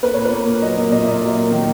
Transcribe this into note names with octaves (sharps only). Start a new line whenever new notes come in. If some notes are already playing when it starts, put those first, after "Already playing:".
A#3 B4
A#2 C#5
B4
A#3
A#2
F#3 D#5
A#3
A#2 D#5
E5
A#2 D#5
F#3
A#3
D#3